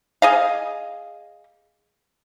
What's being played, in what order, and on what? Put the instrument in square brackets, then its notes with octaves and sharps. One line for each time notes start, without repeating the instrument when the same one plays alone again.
[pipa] G#4 D#5 F5